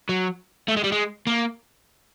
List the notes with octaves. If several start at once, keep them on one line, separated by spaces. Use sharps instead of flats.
F#3
A3
G#3
G3
G#3
A#3